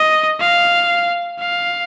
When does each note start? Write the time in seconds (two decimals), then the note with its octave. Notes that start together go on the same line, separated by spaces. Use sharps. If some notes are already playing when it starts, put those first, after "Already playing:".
Already playing: D#5
0.40 F5
1.39 F5